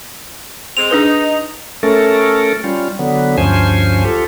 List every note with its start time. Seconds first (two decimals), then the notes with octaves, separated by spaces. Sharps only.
0.77 G#3 C4 F7
0.91 D4 D#4 G#4 B4
1.83 A3 C#4 A4 A#4
2.64 G3 C#4 F4
2.99 D3 F#3 B3
3.38 D2 G2 F3 C#4 C5 G#5
4.05 F4 G4 A4